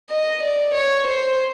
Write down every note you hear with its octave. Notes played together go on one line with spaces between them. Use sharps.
D#5
D5
C#5
C5